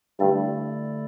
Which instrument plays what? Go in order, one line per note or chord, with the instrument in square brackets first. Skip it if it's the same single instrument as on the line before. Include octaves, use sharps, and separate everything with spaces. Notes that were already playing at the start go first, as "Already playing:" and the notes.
[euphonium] G2 [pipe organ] D3 A3 E4 A4 D5